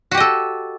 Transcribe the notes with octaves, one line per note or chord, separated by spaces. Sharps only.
F#4 G4 A4 D#5